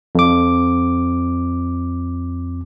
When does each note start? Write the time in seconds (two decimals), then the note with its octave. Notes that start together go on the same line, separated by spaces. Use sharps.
0.15 F2 D6